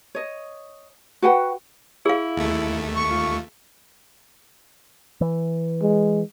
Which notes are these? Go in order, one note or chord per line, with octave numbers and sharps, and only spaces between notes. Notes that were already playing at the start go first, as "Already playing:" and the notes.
C#5 D#5
F#4 B4 F#5 G5
E4 G#4 F5
D#2 A3
C#6
F4
E3
G#3